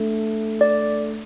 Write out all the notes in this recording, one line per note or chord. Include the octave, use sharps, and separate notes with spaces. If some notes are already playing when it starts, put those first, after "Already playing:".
Already playing: A3 D4 A4
D5